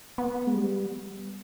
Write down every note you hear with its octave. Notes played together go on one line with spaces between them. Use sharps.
B3
G#3
G3